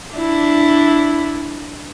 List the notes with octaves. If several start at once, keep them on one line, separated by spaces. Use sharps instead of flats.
D4 E4